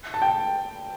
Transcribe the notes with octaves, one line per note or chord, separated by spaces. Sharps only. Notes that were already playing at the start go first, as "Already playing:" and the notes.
A5
G5